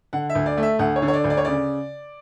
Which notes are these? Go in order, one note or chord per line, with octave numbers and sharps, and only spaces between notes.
D3 F#5
E5
D2
D5
A3
E5
D2 F#5
C#5
D3
C#5
D5
D2
D5
C#5
C#3 D5